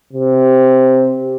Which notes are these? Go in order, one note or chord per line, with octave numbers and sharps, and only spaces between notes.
C3